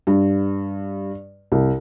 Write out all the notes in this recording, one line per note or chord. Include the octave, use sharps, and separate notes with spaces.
G2
C2